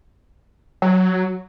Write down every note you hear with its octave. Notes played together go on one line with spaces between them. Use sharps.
F#3